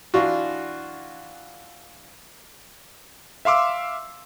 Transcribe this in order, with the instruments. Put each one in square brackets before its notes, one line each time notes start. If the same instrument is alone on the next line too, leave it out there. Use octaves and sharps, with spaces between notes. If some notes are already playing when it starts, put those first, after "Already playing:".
[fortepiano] E3 D4 F4 F#4
[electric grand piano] E5 F5 C6 D6 E6